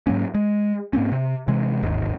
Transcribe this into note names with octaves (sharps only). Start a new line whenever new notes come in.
G#2 F#3 A#3 C#4
G#3
G#2 A#3 C4 C#4
C3
C3 E3 G#3
D1 G#1 D#2 G#2